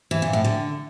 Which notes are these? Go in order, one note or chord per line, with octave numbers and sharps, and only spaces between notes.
E3
A#2
A2
D3